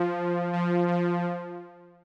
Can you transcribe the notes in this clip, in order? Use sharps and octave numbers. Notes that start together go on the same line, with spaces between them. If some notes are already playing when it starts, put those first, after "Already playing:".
Already playing: F3
F3
F3